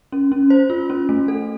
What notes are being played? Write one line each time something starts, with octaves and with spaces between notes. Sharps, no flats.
C#4
C#4
C5
F4
C#4
A3
A4